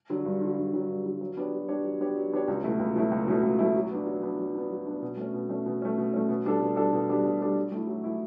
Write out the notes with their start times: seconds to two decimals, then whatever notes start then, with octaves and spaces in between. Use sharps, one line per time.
0.10 D3 F#3
0.25 G2
0.41 D3 F#3
0.57 G2
0.73 D3 F#3
0.89 G2
1.05 D3 F#3
1.21 F#3
1.37 B3 D4 G4 C#5
1.52 F#3
1.68 B3 D4 G4 C#5
1.84 F#3
2.00 B3 D4 G4 C#5
2.16 F#3
2.32 B3 D4 G4 C#5
2.48 C#2
2.64 B2 F#3 A3 E4
2.79 C#2
2.96 B2 F#3 A3 E4
3.11 C#2
3.27 B2 F#3 A3 E4
3.43 C#2
3.59 B2 F#3 A3 E4
3.75 F#3
3.91 B3 D4
4.07 F#3
4.22 B3 D4
4.39 F#3
4.54 B3 D4
4.70 F#3
4.87 B3 D4
5.02 B2
5.17 A3 C#4
5.34 B2
5.49 A3 C#4
5.66 B2
5.82 A3 C#4
5.98 B2
6.14 A3 C#4
6.29 B2
6.44 G3 D4 A4
6.61 B2
6.76 G3 D4 A4
6.93 B2
7.09 G3 D4 A4
7.25 B2
7.40 G3 D4 A4
7.56 F#3
7.72 A3 E4
7.87 F#3
8.04 A3 E4